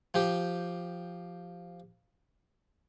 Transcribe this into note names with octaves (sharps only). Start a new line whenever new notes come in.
F3 G4